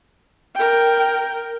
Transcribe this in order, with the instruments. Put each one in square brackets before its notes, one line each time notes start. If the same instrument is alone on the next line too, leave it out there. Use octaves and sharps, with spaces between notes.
[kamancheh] A#4 G5